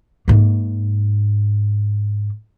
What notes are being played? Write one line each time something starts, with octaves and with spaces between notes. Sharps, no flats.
G#2 A#3